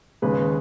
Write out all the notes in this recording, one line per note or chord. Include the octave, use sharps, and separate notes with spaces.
D#2 C#3 G#3 B4